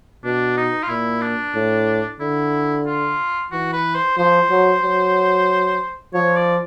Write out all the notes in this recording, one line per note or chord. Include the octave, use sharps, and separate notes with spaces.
B2 D4
D#4
F4
A#2 E4
D4
A2
D3 E4
F4
E3 F#4
B4
C5
F3 C5
F#3
F#3
F3 C#5
D5